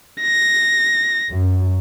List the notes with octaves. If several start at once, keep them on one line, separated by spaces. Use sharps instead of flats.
A#6
F#2